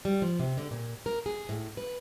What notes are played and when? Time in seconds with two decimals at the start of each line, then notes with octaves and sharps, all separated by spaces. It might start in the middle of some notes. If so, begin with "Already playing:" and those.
0.05 G3
0.22 F3
0.39 C3
0.58 D3
0.71 A#2
1.06 A#4
1.26 G#4
1.49 A2
1.77 B4